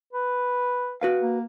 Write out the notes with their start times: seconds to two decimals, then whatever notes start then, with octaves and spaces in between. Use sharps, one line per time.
0.13 B4
1.01 F#4 B4 F5
1.22 A#3